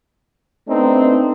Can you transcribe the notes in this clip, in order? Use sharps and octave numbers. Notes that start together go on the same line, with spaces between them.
A3 B3 C4 D4 D#4